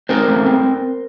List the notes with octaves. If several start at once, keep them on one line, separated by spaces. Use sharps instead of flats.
C4 A#4 C5
A3
C4